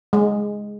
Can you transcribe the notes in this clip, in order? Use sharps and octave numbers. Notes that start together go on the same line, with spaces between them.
G#3